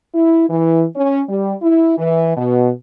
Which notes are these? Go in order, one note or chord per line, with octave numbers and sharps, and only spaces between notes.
E4
E3
C#4
G3
E4
E3
B2